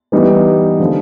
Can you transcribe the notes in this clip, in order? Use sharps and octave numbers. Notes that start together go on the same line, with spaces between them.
E3 G3 B3 D#4
D3 F3